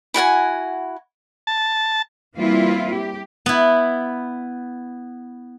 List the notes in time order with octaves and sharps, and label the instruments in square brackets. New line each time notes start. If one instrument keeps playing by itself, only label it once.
[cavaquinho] E4 F#4 F#5 G#5
[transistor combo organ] A5
[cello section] E3 G3 A#3 C4 E4 F4
G4
[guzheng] B3 E4